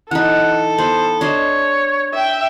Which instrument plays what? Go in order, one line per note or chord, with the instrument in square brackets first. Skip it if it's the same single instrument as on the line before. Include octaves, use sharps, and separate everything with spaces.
[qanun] E3 D#4 [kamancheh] A4 [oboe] F#5
[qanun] B3 [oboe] C5
[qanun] D4 C5 D#5 [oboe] C#5
[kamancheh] E5 G5